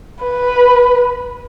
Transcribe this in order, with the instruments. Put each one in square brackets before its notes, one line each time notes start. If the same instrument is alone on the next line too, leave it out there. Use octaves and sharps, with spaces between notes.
[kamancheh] B4